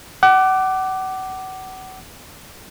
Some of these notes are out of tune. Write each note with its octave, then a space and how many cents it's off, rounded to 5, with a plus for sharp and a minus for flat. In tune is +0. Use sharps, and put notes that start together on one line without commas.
F#5 +35 D6 +0